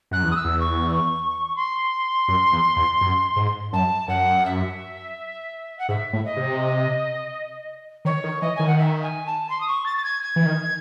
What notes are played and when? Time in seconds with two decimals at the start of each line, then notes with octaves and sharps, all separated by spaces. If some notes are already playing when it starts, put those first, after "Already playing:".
0.11 F#2 F#6
0.23 E2
0.31 D#6
0.35 E6
0.44 E2
0.60 C#6
1.56 C6
2.28 F#2
2.52 E2
2.76 E2
3.01 F#2
3.36 G#2
3.73 F#2 A5
4.08 F#2 F#5
4.45 E5
5.78 F#5
5.89 G#2 E5
6.13 A2
6.25 D#5
6.37 C3
8.05 D#3 C#5
8.24 D#3
8.41 E3 D#5
8.56 D#3 G#5
8.67 F#5
8.78 E5
9.02 G#5
9.26 A5
9.50 C6
9.60 D#6
9.68 C#6
9.85 A6
9.97 A6
10.03 G#6
10.22 G#6
10.36 E3
10.46 D#3